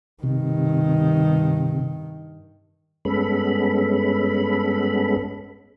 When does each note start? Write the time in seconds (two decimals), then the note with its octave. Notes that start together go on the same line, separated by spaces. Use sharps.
0.23 G2 C3 D#3
3.05 G2 G#3 B3 C#4 A4 B5